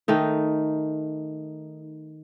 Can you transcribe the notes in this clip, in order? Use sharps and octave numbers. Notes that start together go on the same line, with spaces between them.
D#3 A3 D#4